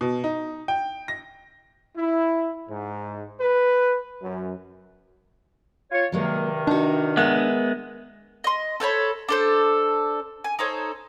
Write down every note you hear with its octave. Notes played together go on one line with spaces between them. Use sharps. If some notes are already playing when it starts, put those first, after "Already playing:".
B2
D#4
G5
A#6
E4
G#2
B4
F#2
F4 C#5
G2 C3 D#3 F#3 G#3 A#3
D4 D#4 F#4
G#3 B3 A#4 E5
D#5 C6
A4 C5 C#5 B5
D4 A4 C5
G#5
D#4 A4 C5 C#5